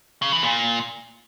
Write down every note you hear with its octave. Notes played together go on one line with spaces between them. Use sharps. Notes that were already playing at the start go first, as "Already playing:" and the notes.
C#3
E3
A#2